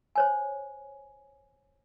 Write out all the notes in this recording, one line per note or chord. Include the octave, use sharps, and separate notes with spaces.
C5 C#5 G#5